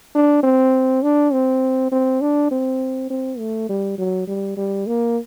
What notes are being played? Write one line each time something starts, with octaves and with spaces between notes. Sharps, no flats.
D4
C4
D4
C4
C4
D4
C4
C4
A3
G3
F#3
G3
G3
A#3